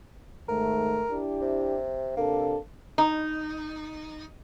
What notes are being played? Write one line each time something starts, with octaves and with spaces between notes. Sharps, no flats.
G#2 D#3 A3 A#4
D4 E4 G4
C3
C3 A#3 D4 A4
D#4